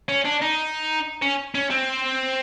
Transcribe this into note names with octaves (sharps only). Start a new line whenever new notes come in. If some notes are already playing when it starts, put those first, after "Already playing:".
C#4
D4
D#4
C#4
C#4
C4